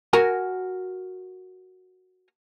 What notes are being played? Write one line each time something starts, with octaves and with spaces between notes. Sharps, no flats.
F#4 A#4 G#5